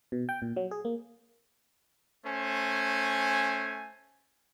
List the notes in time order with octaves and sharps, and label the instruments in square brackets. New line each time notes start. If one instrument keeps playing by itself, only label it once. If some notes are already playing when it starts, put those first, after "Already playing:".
[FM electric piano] B2
G5
A#2
F#3
G#4
A#3
[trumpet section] A3 C#4 C5 G#5